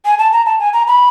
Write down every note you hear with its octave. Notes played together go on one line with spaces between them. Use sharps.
G#5
A5
A#5
A5
G#5
A#5
B5